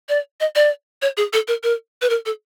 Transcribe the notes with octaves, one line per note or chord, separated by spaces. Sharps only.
D5
D#5
D5
C#5
G#4
A4
A#4
A#4
B4
A#4
A4